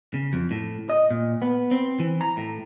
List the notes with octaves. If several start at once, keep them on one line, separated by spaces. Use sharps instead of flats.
C#3
F2
A2
D#5
A#2
B3
C4
E3
A#5
A2